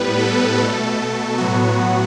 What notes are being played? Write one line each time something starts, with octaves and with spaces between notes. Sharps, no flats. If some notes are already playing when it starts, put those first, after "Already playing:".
Already playing: A2 G3 B3 B4
A4
B2 A3 A4
A2 F#3 B3 F#4